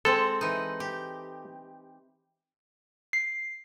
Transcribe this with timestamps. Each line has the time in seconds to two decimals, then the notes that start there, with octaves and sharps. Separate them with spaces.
0.05 G#3 C4 A4
0.41 E3 D#4
0.80 G4
3.13 C7